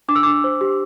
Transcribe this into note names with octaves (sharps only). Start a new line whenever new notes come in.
D4 D6
E6
D4 D6
C5
G4